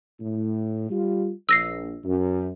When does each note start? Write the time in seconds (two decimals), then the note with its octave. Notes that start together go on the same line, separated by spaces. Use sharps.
0.20 A2
0.90 G3 F4
1.49 A#1 E6 A#6 C7
2.04 F#2